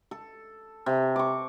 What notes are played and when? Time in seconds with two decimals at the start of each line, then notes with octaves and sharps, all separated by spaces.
0.11 A4
0.86 C3
1.16 C#6 D6